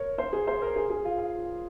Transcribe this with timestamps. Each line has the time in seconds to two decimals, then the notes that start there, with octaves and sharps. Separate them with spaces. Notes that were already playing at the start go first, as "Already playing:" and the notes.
Already playing: A#4 C#5
0.18 C5
0.33 G#4
0.47 C5
0.62 A#4
0.76 G#4
0.90 G#4
1.05 F4
1.18 F4